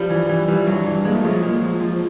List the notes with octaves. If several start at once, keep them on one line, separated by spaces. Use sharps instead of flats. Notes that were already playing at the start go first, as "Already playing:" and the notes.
Already playing: G2 F3 G3
E3
E3
E3 F3 G3
G2 F#3
E3
A#2 G#3
A3
F3 F#3 G#3
A#2
F3
F3